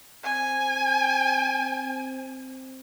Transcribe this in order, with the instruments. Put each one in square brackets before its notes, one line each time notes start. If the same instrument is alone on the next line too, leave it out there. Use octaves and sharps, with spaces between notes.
[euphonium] C4 [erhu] G#5